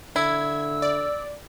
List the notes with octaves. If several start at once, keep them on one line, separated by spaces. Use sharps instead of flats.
D3 E4 E6 G#6
D5